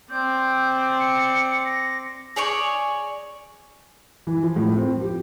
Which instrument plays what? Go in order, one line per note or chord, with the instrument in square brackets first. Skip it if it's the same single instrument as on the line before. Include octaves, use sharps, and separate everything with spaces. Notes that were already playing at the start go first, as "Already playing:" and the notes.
[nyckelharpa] C4 D5 [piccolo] G6
[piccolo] C#7
A#6
[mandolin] G#4 C#5 D5 C#6
[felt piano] E3
F3
A2
C4
F3
G4